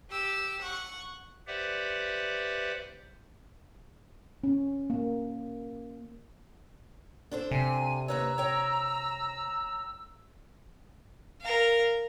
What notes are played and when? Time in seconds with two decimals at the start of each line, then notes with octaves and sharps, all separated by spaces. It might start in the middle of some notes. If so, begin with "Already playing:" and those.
0.10 G4 E6
0.62 F#5 C#6
1.47 G4 B4 C5 D5 E5 F#5
4.44 C#4
4.90 A#3
7.31 D4 A4 C5
7.51 C3 G#5
8.08 D#2 B4 C#5 A#5 E6
8.38 C#5 G5
11.41 A#4 F5